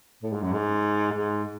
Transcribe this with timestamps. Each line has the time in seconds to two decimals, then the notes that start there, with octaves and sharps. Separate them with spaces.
0.23 A2
0.33 G#2
0.42 F#2
0.53 G#2
1.12 G#2